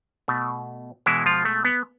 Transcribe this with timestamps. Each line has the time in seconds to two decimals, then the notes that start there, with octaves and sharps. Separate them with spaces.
0.28 B2 A3
1.06 B2 E3 G#3 E4
1.26 F3 F4
1.45 A3
1.65 B3